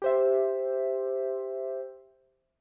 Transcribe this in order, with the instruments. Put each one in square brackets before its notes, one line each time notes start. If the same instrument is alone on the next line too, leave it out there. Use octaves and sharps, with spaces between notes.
[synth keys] G4 C5 E5